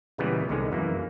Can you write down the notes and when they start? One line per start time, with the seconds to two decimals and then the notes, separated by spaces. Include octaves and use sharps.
0.18 A#2 C#3 E3 G3 G#3 B3
0.49 C2 D3 D#3 G#3
0.72 F#2 E3 A#3